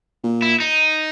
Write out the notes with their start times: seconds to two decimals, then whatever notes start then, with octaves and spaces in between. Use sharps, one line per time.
0.24 A#2
0.42 E4
0.60 D#4